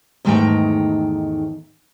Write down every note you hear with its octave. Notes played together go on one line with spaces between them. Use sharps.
E2 G#2 D#3 A3 G5 A#5